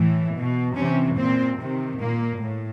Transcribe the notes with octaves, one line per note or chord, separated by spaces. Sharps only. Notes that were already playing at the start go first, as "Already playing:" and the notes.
Already playing: A2 E3
B2
C3 E3 C#4
A#2 C4
C3 D#3
A#2 A#3
A2